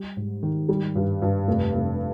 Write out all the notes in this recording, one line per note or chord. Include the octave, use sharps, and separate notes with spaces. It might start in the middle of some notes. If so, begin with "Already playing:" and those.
Already playing: G3
G#2
D#3
G3
G2
G2
F1
F1